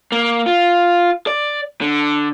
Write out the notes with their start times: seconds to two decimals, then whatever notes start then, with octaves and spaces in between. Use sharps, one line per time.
0.12 A#3
0.46 F4
1.27 D5
1.81 D3